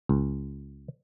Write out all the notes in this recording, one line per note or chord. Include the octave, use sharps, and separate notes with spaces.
C#2